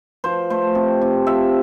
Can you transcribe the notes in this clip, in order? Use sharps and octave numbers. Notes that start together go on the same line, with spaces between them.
F3 C5
A3 C5
C3
C3
F3 E5